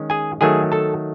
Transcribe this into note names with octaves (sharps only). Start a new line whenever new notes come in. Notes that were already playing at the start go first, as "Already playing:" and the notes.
Already playing: D#3 G#3 C#4
G#4 G#5
D#3 F#3 A3 G#4 G#5
A4 A5